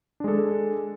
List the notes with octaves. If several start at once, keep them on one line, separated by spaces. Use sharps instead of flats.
G#3 D4 A4